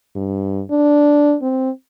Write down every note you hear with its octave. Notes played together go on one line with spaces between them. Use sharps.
G2
D4
C4